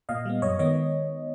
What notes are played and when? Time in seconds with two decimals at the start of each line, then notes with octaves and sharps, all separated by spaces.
0.09 A#2 D#5 F5
0.25 G3 B3
0.42 F#2 C#5 D#5
0.59 D#3 G#3 B3 C#5 D#5